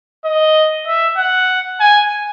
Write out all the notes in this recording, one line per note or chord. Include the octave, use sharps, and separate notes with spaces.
D#5
E5
F#5
G#5